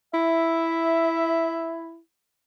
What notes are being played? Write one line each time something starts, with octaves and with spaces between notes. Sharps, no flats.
E4 E5